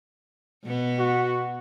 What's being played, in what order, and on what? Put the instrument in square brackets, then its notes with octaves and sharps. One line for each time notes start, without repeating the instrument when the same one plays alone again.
[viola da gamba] B2 B3
[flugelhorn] F#4